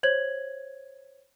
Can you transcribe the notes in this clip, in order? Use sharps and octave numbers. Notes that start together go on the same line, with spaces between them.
C5 C#5 G#6 F#7